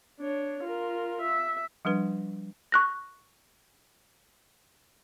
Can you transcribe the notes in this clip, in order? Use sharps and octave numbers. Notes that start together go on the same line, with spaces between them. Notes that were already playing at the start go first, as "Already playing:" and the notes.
D4 C#5
F4 A#4
E5
F3 G3 D4 B4
C#6 F#6 A#6